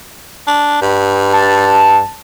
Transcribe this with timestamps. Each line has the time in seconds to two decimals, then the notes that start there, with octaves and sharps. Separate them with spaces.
0.47 D4
0.81 G2
1.33 A5